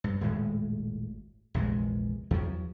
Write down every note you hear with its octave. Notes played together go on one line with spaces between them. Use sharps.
G2
D#1 G#1 A2 G#3
A#1 E2 C3 G#3
E2 F3 F#3